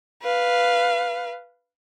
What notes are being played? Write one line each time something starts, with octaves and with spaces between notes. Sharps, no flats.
B4 F5